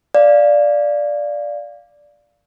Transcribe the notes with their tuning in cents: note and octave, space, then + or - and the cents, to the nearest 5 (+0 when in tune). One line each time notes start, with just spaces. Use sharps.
D5 +0 F5 +0